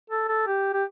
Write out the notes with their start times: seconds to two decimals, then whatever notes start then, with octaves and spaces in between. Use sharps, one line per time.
0.10 A4
0.28 A4
0.47 G4
0.73 G4